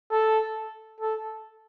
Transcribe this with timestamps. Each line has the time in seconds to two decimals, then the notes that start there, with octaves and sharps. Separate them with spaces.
0.11 A4
1.01 A4